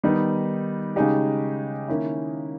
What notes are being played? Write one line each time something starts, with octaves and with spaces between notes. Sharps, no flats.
D#3 G3 B3 D#4
C#3 G#3 D#4 G4
D#3 A#3 C#4 E4